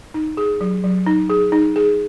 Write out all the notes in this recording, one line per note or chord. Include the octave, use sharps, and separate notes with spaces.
D#4
G#4
F#3
F#3
D#4
G#4
D#4
G#4